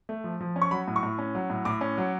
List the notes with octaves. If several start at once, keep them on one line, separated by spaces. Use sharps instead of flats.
A3
F3
F3
C#4
C#6
F#3 B5
A2
C#6
A2
C#4
F#3
A2
A2 D6
C#4
F#3